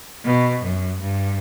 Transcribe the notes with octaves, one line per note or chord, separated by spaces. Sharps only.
B2
F#2
G2